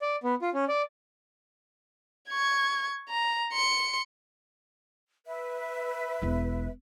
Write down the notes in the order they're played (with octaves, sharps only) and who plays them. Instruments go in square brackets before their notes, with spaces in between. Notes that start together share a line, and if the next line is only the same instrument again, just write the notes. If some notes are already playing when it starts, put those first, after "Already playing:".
[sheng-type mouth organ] D5
B3
F4
C#4
D5
[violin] C#6 G#6
A#5
C6 C#7
[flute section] B4 E5
[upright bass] E1 E4